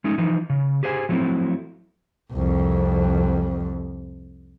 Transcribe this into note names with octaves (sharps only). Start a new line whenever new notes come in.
G#3 A3 C#4 D#4
E3 F3 D#4
C#3
G4 G#4 C5 D#5 G#5
F3 F#3 A3 B3 C4 E4
C2 F2